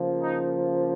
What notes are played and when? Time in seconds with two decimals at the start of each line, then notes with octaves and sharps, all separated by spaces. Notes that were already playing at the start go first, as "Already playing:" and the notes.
Already playing: C#3 F3 A#3
0.22 D#4